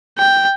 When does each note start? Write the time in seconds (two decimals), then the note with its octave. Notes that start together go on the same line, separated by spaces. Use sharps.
0.18 G5